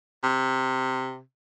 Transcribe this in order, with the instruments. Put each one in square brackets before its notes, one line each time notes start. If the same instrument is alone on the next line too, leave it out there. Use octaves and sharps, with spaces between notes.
[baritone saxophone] C3